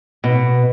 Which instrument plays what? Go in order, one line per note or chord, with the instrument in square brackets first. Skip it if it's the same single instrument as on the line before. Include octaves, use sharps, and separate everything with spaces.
[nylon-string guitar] B2